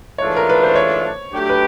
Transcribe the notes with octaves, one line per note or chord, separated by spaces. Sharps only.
G#2 E3 A3 D4 F4 C#5
A#4
B4
C5
C#5
F#3 A3 D4 G4
B4